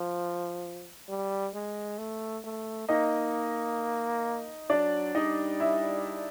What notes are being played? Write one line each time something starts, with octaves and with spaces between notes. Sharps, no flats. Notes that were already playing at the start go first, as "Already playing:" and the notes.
Already playing: F3
G3
G#3
A3
A3
A#3 D#4 D#5
F#3 D4 D5
G3 D#4 D#5
E4 E5